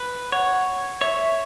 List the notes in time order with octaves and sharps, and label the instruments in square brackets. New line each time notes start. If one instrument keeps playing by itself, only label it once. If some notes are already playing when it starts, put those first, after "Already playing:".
Already playing: [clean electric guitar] B4
[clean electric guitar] C#5 [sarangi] F#5
[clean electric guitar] C#5 [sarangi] E5